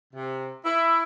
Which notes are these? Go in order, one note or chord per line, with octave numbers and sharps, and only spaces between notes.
C3
E4